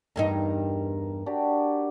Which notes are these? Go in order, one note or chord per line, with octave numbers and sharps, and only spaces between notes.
E2 G2 D#4 A#4 A#5
D4 F#4 G4